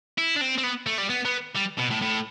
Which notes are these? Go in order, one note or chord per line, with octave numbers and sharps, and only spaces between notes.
E4
D4
C4
C4
B3
A3
G3
B3
B3
G3
B2
A2
A2